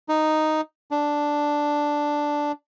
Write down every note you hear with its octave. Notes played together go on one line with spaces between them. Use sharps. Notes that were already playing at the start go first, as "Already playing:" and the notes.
D#4
D4